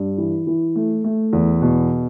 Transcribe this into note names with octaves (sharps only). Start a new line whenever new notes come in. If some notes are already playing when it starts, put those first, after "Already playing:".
Already playing: G2
E3
E3
A3
A3
E2
B2